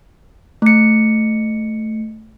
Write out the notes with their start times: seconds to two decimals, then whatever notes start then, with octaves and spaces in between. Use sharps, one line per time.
0.62 A3 C#7